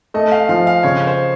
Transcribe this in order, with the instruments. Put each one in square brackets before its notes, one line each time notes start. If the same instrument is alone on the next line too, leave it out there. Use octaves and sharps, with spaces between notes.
[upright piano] A3 [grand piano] D#5
[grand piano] F5
[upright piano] F3 [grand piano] F5
[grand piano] F5
[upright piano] C#3 [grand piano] C#5
[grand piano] C5